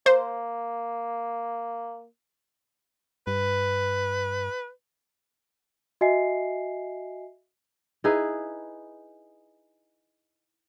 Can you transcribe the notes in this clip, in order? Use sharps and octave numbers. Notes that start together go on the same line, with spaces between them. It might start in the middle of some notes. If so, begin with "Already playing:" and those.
A#3 C5
G2 B4
F#4 D#5 E5 G#5 C7
D#4 E4 G#4 B4